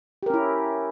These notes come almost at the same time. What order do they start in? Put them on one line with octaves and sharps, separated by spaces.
G4 A#4 C#4 E4